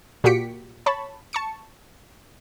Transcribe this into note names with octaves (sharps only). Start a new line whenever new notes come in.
A#2 F#4 G4 B6 C#7 D7
C#5 A5 B5 C#6
A5 C#6 C#7